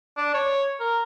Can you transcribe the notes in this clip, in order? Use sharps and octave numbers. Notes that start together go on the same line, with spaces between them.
D4
C#5
A#4